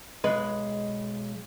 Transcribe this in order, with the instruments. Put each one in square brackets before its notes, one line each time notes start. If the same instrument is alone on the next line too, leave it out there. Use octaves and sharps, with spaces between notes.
[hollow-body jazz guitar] B1 G#3 B4